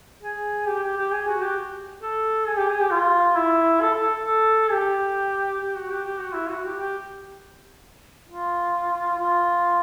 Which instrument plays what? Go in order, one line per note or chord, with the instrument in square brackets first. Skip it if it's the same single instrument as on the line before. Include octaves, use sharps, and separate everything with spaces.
[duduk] G#4
G4
G4
G4
G#4
F#4
G4
A4
G#4
G4
G#4
G4
F4
E4
A4
A4
A4
G4
G4
F#4
G4
G4
F#4
E4
F#4
G4
G4
F4
F4